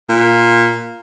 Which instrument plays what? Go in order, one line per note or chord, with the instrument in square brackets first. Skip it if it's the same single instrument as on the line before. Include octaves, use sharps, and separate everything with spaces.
[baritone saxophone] A#2